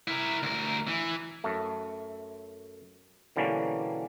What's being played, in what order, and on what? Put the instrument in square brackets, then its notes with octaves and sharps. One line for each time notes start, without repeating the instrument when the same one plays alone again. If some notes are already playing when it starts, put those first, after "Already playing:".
[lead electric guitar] E4 A#4
D2 A#4
E3
[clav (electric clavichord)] F#2 A3
B2 D3 E3 G3 A#3 C#4